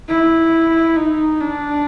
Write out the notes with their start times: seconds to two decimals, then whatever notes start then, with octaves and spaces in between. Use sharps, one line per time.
0.09 E4
0.96 D#4
1.41 D4